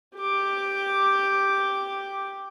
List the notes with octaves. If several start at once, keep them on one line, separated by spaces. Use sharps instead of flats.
G4 D6